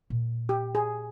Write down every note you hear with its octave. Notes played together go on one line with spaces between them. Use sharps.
A#2
G4
G#4